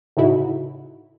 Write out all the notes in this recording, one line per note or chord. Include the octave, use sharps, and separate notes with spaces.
A2 C#3 D#4 E4 F#4